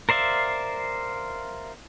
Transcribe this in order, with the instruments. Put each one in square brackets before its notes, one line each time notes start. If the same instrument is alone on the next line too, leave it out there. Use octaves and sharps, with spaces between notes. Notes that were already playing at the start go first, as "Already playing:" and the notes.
[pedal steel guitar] A#4 C5 D5 E5 F5